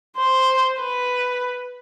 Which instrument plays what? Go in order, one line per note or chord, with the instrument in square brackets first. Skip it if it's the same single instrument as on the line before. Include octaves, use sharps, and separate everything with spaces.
[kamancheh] C5
B4